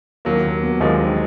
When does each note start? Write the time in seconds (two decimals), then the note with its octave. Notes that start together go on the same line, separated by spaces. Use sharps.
0.25 D#2 F#3 A#3
0.44 D#2
0.63 B3
0.80 D#2 F3 G#3
0.99 D#3